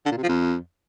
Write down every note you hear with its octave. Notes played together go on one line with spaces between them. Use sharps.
D3
A#2
C3
F3
F2